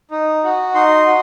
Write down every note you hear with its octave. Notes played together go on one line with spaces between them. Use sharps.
D#4
F#4
D#4 C6
F#4